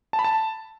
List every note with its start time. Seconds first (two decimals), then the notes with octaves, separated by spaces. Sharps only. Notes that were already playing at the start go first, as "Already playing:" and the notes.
0.13 A5
0.19 B5
0.24 A5